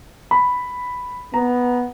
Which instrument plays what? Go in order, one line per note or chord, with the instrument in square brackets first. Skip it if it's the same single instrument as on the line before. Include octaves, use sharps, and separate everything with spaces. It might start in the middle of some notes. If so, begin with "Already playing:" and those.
[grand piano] B5
[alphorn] B3 [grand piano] A#5